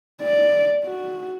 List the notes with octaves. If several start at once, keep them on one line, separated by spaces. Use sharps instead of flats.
D5
F#4